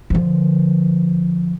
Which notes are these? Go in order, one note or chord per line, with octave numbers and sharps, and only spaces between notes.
D3 F3